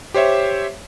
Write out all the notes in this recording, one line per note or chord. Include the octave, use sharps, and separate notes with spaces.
G4 C5 C#5 E5